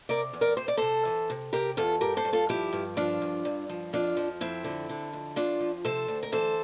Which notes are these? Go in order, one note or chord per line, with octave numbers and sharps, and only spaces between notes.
C3 A#4 D5
E2
A#4 D5
C3 C5
D5
C3 A4 C5
E3
C3
C3 G4 A#4
E2 F4 A4
G2 G4 A#4
A4 C5
G2
F4 A4
F3 E4 G4
G2
F3 D4 F4
G2
G2
F3
F2 D4 F4
F3
F2 C4 E4
D3
D3
F2
F2 D4 F4
F3
C3 A4 C5
D2
A#4
E3 A4 C5